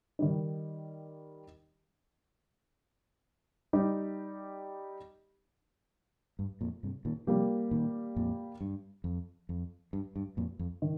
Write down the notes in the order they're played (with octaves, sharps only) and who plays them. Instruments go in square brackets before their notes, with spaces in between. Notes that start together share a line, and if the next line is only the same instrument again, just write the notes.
[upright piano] D#3 G3 D#4
G3 D#4 G4
[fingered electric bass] G2
F2 A#2
G2 C3
A#2 D#3
[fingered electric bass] C3 F3 [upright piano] G3 A#3 G4
[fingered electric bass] A#2 D#3
F2 A#2
G2
F2
F2
G2
G2
F2 A#2
F2
[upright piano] D#3